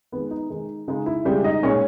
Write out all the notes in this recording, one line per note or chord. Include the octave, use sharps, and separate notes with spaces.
D#3 G#3 B3 B4
D#4
D#3 G#3 D#4
C#3 G#3 D#4
E4
C#3 G3 G#3 G4
D#4 D#5
A#2 G#3 C#4 C#5